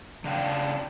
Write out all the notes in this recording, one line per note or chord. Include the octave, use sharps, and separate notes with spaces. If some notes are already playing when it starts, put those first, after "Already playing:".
C#3 D4 F5 G5